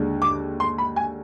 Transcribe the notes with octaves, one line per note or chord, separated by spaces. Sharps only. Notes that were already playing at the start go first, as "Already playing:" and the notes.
Already playing: D#2 D3 G#3
D6
C6
B5
G#5